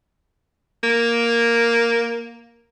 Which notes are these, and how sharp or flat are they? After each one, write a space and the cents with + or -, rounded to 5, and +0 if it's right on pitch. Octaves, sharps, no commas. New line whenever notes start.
A#3 +0